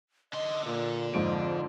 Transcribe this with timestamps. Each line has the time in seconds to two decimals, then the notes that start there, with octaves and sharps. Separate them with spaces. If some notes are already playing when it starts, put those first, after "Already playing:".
0.33 D3 D#5 C6
0.66 A#2 A#3
1.14 F2 G#2 F3 D7